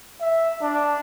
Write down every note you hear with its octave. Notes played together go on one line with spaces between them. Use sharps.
E5
D4